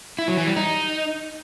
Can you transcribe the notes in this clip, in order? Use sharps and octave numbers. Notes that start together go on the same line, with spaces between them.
E4
F#3
E3
G3
D#4